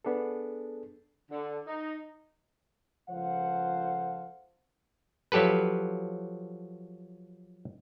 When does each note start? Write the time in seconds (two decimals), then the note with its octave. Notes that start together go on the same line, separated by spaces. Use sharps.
0.05 B3 D4 G#4 A4
1.31 D3
1.67 D#4
3.10 C#2 F3 A4 C5 F5 F#5
5.32 F3 F#3 G4 A4 B4